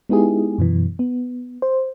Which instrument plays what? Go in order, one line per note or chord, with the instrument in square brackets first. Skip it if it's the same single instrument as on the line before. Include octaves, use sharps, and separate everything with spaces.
[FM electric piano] G#3 B3 D#4 E4 G4 G#4
F#2 B2 E3
B3
C5